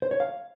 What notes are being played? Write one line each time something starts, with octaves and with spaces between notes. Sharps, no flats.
C5
C#5
F5